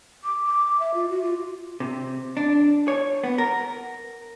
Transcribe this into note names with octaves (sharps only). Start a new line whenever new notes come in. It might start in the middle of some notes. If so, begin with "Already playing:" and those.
D6
D6
E5
F4
F#4
F4
C3
D4
C#5
B3
A#4